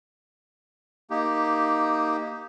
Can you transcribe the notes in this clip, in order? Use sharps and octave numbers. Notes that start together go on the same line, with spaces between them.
A#3 D#4 G4